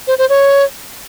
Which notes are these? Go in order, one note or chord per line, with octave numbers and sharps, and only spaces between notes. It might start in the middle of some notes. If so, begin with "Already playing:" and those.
C5
C5
C#5